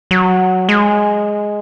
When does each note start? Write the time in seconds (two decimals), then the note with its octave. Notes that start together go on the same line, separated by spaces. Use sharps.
0.11 F#3
0.69 G#3